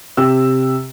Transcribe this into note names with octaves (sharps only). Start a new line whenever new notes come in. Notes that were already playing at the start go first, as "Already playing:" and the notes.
C3 G4 E6